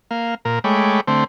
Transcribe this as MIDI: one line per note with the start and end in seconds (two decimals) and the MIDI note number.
0.11 0.35 58
0.11 0.35 77
0.45 0.59 46
0.45 0.59 70
0.64 1.01 56
0.64 1.01 57
0.64 1.01 73
0.64 1.01 79
0.64 1.01 83
0.64 1.01 86
1.07 1.24 50
1.07 1.24 57
1.07 1.24 60
1.07 1.24 72